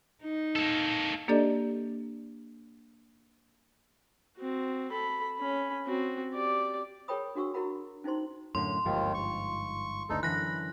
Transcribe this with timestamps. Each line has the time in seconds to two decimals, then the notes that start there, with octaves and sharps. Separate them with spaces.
0.23 D#4
0.56 A#3 A4
1.28 A#3 D4 G4 A4 D5 D#5
4.38 C4 F#4
4.91 A4 B5
5.37 C#4 B5
5.86 C4 F#4
6.34 G4 D5
7.08 G#4 A#4 C#5 G5 B5 D#6
7.35 D4 F#4 F#5 C#6 E6
7.54 E4 F#4 A#4 F#5 B5
8.04 C#4 D#4 E4 C5 C6
8.55 F#2 A2 D3 C6
8.85 G1 D#2 G#2 D#3 F3
9.14 C#6
10.10 F#1 D2 D#4 A4
10.23 F#2 D3 E3 B5 F#6 A#6